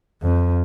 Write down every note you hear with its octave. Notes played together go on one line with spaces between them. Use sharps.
F2